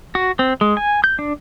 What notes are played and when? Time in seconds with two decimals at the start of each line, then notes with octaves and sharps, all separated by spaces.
0.15 F#4
0.39 C4
0.61 G#3
0.77 G#5
1.04 G6
1.19 D4